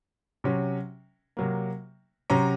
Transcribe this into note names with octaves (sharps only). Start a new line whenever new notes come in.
C3 F#3 C#4
C3 F#3 A#3
C3 F#3 C#4 A#5